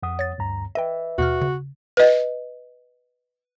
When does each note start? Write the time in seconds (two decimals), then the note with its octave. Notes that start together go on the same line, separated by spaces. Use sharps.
0.03 F2 F#5 D#6
0.19 C#5 A6
0.38 D2 G2 A#5
0.75 B4 D#5 E5 G5
1.18 D#2 B2 F#4 F6
1.42 C#3
1.97 B4 D#5